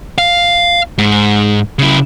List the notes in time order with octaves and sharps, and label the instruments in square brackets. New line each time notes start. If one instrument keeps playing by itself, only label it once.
[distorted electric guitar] F5
G#2
C#3 E4